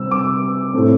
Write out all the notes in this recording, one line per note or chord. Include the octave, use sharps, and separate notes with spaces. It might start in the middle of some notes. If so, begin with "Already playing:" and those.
Already playing: C3 G3 C4 E6
D6
A2 A3 C4